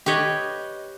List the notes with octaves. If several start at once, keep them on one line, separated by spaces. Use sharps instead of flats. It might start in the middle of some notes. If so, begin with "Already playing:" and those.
G4 B4 C#5 D#5